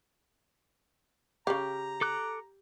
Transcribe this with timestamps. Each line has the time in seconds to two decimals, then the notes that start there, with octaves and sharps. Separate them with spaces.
1.47 C#3 G4 F5 A#5
2.01 A4 D6 F#6